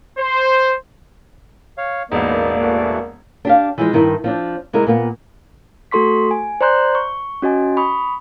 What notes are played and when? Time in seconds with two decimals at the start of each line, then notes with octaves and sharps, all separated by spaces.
0.18 C5
1.78 C#5 F5
2.12 E1 A1 A#3 B3 D#4 D5
2.61 E3 A3 F#4
3.45 D4 G4 F5
3.78 E3 F3 G#3
3.93 G2 D#3 E4
4.24 F3 C4 D4
4.73 C3 G#3 E4 A#4
4.87 A#2 A#3 B3
5.91 A3 F#4 A4 C6 C#6 B6
6.31 G#5
6.61 C5 D5 A#5 C6 F#6 G6
6.95 C#6
7.42 C#4 F#4 D#5 G#5
7.77 B5 C#6 D#6